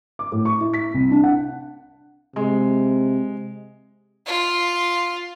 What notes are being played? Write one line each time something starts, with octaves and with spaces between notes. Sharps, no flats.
D6
A2
C#6
E4
B6
C2
D4
F#5
C3 G#3
F4